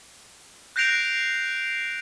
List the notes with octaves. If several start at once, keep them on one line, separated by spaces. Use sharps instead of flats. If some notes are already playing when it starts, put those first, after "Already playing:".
F#6 G6 A#6 C7 D7 F7